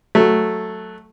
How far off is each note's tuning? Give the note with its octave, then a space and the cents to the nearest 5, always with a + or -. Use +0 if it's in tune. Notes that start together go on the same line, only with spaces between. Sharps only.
F#3 +0 A3 +0